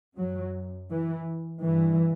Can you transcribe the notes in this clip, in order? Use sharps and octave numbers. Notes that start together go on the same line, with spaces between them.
F#2 F#3
E3
G2 E3